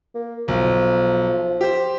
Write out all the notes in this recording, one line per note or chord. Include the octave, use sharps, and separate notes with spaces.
A#3
B1 F3
G4 C5